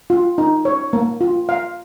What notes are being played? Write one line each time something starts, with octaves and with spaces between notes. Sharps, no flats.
F4
D#4
C#5
A#3
F4
F5